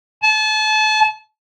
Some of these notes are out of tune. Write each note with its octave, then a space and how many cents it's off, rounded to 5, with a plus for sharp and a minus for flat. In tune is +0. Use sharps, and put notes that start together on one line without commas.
A5 -35